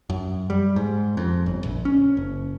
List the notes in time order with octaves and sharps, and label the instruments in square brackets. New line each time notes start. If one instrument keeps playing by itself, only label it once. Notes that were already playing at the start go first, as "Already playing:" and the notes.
[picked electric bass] F#2
G3
G#2
F2
G1
A#1
C#4
F#1